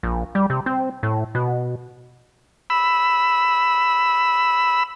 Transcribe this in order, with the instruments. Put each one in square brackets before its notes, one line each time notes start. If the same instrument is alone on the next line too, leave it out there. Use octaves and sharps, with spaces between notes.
[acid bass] A#1
G3
C3
C4
A2
B2
[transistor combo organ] B5 E6